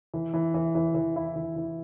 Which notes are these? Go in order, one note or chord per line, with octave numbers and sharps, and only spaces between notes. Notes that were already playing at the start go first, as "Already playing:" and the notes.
E3
E3
E3
E3
E3
E4
E3
E3